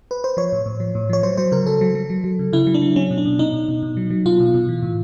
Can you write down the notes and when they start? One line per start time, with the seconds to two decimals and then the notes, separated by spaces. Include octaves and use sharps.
0.11 B4
0.24 C5
0.37 F3 C#5
0.52 A2
0.66 A2
0.80 F3
0.95 A2
1.10 F3 C#5
1.23 F#3 C5
1.37 F#3 C5
1.52 C#3 A#4
1.66 F#3 A4
1.81 F#3
1.95 F#3
2.10 F#3
2.24 F#3
2.39 C#3
2.53 C#3 E4
2.67 F#3
2.74 D4
2.82 F#3
2.96 F#3 C#4
3.11 B2
3.18 D4
3.25 B2
3.39 B2 D#4
3.54 B2
3.69 B2
3.83 B2
3.97 F#3
4.10 F#3
4.25 B2 F4
4.40 B2
4.54 B2
4.69 E3
4.83 A2